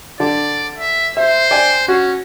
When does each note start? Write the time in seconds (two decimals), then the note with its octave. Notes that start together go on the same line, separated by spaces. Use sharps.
0.20 D3 D5
0.78 E5
1.17 C5 E5
1.51 D5 G5 G#5
1.88 C#4 F#4